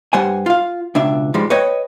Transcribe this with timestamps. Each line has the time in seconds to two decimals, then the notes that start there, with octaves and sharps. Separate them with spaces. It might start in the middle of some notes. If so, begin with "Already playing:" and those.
0.13 G2 G3 C5 F#5 G#5
0.46 F4 F5
0.95 C#2 B2 D4 E5
1.34 G#2 F3 G3 G#3
1.50 B4 C#5 D#5 G5